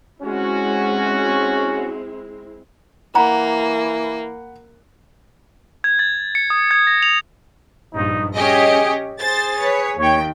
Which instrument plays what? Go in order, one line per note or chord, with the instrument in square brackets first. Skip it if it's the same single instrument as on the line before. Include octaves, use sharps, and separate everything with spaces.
[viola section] G#3 C4 E4 [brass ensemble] C#4 F#4
[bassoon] E3 [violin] A#3 [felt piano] F#5 B5 [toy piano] A#5
[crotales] G#6
A6
C#7
D#6
G#6
A#6
F7
[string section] A#1 G2 [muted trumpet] D#4
[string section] C#4 G4 D#5 [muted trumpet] G#4
[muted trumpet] G#4 [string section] C5 A6
[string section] B4 C#5
[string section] D#2 G5 [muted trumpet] C#5